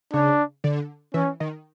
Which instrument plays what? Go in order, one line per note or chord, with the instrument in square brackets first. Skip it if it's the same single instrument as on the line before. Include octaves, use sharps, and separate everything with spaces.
[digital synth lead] C#3 [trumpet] D4
[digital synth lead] D3
[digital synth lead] E3 [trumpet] C#4
[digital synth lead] D#3